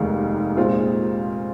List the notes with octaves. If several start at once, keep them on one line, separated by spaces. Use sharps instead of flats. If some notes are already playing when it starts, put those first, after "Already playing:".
Already playing: F1 D#2 D#3 G#3 D#4
A#2 G#3 C4 F4